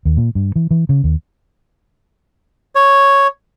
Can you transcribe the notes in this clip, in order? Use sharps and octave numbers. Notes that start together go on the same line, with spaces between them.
D#2
A#2
G2
E3
E3
C#3
D#2
C#5